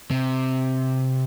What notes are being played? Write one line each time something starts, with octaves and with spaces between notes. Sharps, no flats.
C3